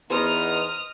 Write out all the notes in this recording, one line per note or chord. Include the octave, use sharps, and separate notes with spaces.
E2 E3 B3 D#4 C5 D#5 D#6 F6